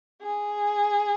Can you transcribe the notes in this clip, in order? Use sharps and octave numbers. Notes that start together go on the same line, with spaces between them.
G#4